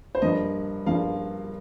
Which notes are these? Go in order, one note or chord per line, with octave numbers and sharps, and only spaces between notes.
C5
G2 F3 A#3 D#5
G2 F3 A#3 F5